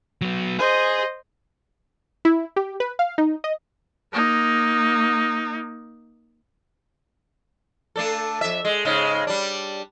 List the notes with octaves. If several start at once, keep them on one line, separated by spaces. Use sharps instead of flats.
F#3 B3
G#4 C5 D#5
E4
G4
B4
F5
D#4
D#5
A#3 D#4
A3 D4 A4
F2 E5
G#3
G#2 C#3 G#3
G3 D4